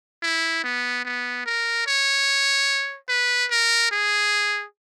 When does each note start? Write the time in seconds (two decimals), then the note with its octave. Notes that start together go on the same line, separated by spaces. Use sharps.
0.23 E4
0.64 B3
1.05 B3
1.46 A#4
1.87 C#5
3.09 B4
3.51 A#4
3.91 G#4